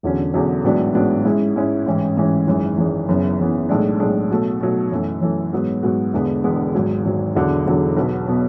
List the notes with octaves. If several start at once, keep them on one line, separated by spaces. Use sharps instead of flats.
E1 E2 D3 F#3 C#4
E1 E2 D3 F#3 C#4
A1 G#2 F#3 B3 D4
A1 G#2 F#3 B3 D4
G#2 G#3 C#4 E4
G#2 G#3 C#4 E4
A1 G#2 E3 G#3 C#4
A1 G#2 E3 G#3 C#4
G#1 F#2 E3 G#3
G#1 F#2 E3 G#3
F#1 F#2 E3 B3
F#1 F#2 E3 B3
B1 A2 G#3 D4
B1 A2 G#3 D4
B2 F#3 A3
B2 F#3 A3
F#2 E3 A3
F#2 E3 A3
G#2 F#3 B3 F#4
G#2 F#3 B3 F#4
E1 E2 D3 G#3 B3
E1 E2 D3 G#3 B3
G#1 G#2 F#3
G#1 G#2 F#3
E1 E2 D3 F#3
E1 E2 D3 F#3
B1 B2 F#3 B3
B2 F#3 B3